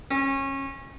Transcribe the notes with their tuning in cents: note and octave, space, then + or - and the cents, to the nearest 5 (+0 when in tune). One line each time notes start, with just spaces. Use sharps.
C#4 -25